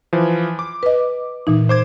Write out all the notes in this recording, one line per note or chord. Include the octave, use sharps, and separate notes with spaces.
E3 F3
D6
B4 D#5
A#2 E3 D#4
C5 D6 G#6